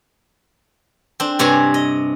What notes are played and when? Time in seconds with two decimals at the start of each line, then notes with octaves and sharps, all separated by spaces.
1.20 C4 D4
1.39 G2 C3 C#5 D5 G#5
1.74 D#5